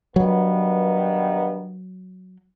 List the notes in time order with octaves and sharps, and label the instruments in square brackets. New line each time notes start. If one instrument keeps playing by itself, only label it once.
[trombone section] G2 D#3 B3 [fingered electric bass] F#3